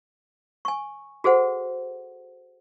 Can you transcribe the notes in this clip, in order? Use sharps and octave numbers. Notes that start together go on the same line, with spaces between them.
G#5 C#6
F#4 G#4 A4 C5 F#5